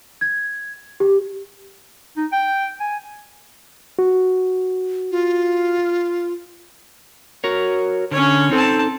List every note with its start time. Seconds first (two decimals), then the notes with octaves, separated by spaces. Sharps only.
0.21 G#6
1.00 G4
2.17 D#4
2.33 G5
2.80 G#5
3.99 F#4
5.11 F4
7.44 F#4 A#4 C#5
8.11 D3 C#4 C#5
8.51 C4 D#4 A4 A5